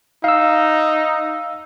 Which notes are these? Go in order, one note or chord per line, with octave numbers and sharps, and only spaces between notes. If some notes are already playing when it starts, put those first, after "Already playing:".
D#4 F5 E6